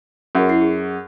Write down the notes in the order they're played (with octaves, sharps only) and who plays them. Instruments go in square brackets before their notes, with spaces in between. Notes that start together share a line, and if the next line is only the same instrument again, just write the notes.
[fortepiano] F#2 [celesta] F#4 G#4 A#4
[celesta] E4 C7
G#4